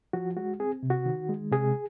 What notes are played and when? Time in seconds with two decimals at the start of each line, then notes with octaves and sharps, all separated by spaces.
0.13 F3 F#4
0.37 G#3 F#4
0.59 C4 G#4
0.83 C3
0.90 F#4
1.06 D#3
1.29 G#3
1.52 C3 G#4